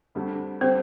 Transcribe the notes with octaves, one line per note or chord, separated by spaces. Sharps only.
D2 D3 G3 C4
D3 G3 C4 C5